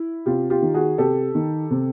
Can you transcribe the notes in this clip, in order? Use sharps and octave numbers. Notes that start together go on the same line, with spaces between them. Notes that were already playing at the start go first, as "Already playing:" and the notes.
Already playing: E4
C3 F4 G4
F4 G4
D#3
F#4 G#4
C3 G4 A4
D#3
C3